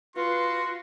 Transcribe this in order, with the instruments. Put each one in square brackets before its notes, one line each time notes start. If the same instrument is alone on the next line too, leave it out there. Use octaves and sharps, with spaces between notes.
[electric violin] F4 [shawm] F#4 [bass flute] B4 [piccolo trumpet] C6